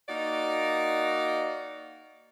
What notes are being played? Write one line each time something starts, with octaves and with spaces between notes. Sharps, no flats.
A#3 D#4 F#4 D5